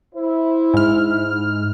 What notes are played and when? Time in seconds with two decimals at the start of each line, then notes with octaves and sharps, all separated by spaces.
0.15 E4 C5
0.74 G#2 F6